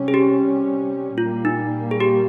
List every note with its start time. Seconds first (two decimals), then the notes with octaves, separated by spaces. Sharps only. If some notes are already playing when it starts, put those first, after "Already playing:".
Already playing: C3 G3 C#4
0.08 G#4
0.14 G4
1.17 A#2 G3 A#3 F4
1.45 D#4
1.91 G#4
2.00 G4